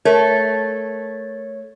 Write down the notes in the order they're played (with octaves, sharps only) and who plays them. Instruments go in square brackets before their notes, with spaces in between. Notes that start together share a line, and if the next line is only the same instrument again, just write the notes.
[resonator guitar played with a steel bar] A3 [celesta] A#4 [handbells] C#5